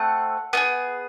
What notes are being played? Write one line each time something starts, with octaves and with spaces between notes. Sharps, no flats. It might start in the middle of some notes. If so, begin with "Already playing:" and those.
Already playing: A3 C4 F#5
B3 D#4 G#4